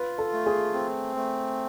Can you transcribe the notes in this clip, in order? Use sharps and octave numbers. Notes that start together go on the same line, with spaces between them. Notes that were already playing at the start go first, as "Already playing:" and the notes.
Already playing: F4 B4
A4
A3
G#4
C4
A3